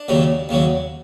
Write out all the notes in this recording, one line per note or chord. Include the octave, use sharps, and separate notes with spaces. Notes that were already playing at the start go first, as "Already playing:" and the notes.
Already playing: D4
D#2 C#3 F#3
D#2 C#3 F#3